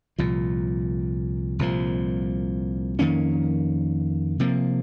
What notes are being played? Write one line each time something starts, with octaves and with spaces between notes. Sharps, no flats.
C2 A#2 F3
C2 A#2 F3
F2 D#3 A#3 C#4
C3 F3 A#3